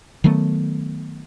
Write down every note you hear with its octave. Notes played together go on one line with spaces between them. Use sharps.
D#3 F#3 A3 B3